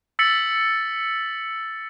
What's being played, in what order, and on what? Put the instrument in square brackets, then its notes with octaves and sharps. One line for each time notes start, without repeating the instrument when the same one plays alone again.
[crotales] E6 A6 B6 C#7 F#7